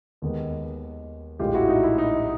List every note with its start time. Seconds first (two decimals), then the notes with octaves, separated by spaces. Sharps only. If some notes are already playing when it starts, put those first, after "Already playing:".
0.22 D#2 D#3 G#3 B3
1.39 A#1 A2 F3 G#3 F4 G4
1.54 E4 F#4
1.69 D#4
1.83 E4
1.98 D#4